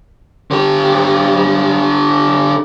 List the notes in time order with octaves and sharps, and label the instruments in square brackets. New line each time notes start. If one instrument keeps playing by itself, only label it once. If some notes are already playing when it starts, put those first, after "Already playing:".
[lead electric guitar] D3 G4